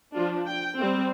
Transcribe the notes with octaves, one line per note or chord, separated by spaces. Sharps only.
F3 D4 F4
G5
G3 C4